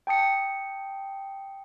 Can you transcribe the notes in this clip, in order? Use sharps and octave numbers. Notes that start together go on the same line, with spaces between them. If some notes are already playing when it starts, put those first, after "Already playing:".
G5 A5 D#6 C#7